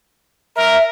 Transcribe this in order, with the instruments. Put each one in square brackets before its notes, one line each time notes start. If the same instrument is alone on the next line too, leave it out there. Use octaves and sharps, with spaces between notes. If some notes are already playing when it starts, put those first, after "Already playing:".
[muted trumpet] A#4 [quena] E5